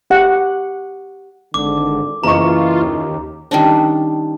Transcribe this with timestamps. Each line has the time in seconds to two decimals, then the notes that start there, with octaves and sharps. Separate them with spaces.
0.10 G4 F#5
1.54 G#1 D3 D6
2.23 F#1 E3 F4 D#5 A#5 C#6
2.82 D#2
3.51 D#3 G3 C#4 D4